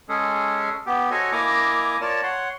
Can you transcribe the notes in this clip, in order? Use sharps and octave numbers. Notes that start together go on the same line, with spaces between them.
G#3 C#4 G#4 A4
B3 G4
F#4 A4 C5 C#5 D#5 G#5
A#3 E4 D#5 G#5 A#5 D6
F4 A#4 C#5 D5 A5
C#5 F#5 C6